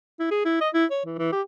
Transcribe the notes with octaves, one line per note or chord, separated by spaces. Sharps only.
E4
G#4
E4
D#5
E4
C#5
E3
E3
G4